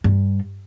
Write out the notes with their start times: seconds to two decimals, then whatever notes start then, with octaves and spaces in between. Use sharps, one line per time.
0.04 G2